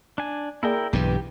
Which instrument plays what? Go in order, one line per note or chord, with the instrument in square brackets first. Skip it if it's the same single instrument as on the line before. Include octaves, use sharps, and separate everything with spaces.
[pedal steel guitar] D4 G#5
[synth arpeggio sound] A#3 G#4 D5 [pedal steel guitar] E4 A#4 G5
[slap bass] B1 G2 E3 [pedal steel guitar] G4